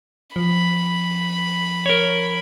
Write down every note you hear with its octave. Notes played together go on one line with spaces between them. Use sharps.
F3 B5
A#4 C#5